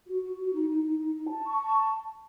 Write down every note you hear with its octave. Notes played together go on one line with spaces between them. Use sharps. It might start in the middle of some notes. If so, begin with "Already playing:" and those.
F#4
F#4
F#4
D#4
D#4
D#4
D#4
D#4
A5
C#6
A5